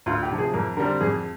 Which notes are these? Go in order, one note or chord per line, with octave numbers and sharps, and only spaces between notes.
D2 F4
G4
C3 F3
G#4
F2 A#4
D3 G3 C4 A#4
F2 G#4